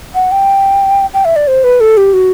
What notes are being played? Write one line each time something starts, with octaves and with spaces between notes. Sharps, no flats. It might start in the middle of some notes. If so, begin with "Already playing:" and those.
F#5
G5
G5
E5
D5
C5
B4
A4
G4
F#4